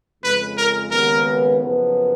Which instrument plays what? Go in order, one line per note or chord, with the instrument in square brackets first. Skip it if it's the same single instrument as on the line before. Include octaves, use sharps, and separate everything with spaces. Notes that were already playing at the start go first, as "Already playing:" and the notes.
[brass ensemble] F2 C#3 G#3 [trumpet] B4
[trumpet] A#4
[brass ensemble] D#2 C#3 G#3 B3 [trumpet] A#4
[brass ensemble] F#1 F#2 F3 B3